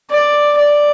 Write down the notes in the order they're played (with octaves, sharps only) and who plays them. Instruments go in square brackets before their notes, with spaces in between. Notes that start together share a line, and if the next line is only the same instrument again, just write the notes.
[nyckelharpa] D5
D5